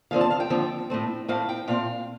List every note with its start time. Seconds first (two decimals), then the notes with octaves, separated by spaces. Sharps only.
0.11 D#2 D3 F3 C4 F5
0.21 A5
0.31 F5
0.40 G5
0.50 D#2 D3 F3 C4
0.90 A2 A3 C4
1.28 A2 A3 C4 F5
1.49 G5
1.68 A#2 A3 C4 F5